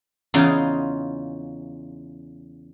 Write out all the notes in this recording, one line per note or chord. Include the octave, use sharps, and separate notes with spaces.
E2 C#3 D#4 F4 C6